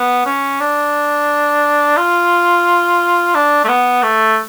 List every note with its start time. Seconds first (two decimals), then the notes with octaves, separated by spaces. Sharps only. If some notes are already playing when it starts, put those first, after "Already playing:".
Already playing: B3
0.26 C#4
0.60 D4
1.97 F4
3.35 D4
3.64 A3
3.69 B3
4.03 A3